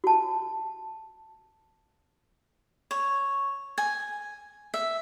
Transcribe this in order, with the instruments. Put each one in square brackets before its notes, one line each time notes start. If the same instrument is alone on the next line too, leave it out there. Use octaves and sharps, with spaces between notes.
[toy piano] F#4 A5
[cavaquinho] C#5
G#5
E5